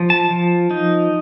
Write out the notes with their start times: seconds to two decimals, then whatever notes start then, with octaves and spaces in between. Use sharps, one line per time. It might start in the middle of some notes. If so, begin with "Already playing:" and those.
Already playing: F3
0.10 A5
0.31 F3
0.71 D#4